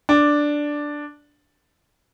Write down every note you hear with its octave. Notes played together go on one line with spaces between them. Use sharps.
D4